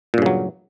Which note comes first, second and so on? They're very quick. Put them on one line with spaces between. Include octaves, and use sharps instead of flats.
A#2 G2 C#3 F#3